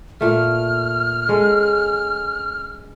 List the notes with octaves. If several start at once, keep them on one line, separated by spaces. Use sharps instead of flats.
A#2 A3 F6
G#3 C#4 A4